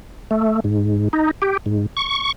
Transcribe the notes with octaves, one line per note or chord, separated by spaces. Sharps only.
A3
G#2
D#4
G4
G#2
C#6